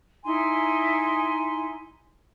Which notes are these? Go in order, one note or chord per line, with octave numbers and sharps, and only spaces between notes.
D#4 E4 G#5 C6